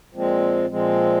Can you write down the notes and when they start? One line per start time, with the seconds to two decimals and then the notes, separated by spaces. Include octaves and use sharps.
0.12 A#2 F3 G#3 C4
0.70 A#2 F3 G#3 C4